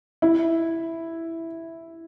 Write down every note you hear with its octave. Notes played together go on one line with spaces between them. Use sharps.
E4